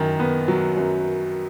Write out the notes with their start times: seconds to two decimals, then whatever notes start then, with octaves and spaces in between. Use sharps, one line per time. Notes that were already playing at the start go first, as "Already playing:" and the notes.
Already playing: F#2 D#3
0.20 B3
0.48 F#3
0.77 F#2